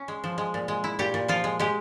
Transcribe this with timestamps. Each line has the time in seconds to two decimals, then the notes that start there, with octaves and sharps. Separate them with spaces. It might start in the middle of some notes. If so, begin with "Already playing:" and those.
Already playing: C#4
0.08 G#3
0.24 F3
0.38 G#3
0.54 A#2
0.68 G#3
0.84 E4
0.99 A#2 G4
1.14 A#2
1.28 F3 F4
1.44 G#3
1.59 G#3 G4